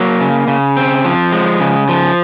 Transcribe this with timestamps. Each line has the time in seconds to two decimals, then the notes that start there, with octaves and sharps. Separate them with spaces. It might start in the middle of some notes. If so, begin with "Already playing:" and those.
Already playing: F#3 A#3
0.21 C#3
0.48 C#3
0.77 C4
1.05 F3
1.32 G#3
1.60 C#3
1.89 F3